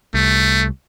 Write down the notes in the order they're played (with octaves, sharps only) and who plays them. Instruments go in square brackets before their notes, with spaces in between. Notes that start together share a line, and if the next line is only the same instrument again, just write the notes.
[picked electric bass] C2 [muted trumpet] A3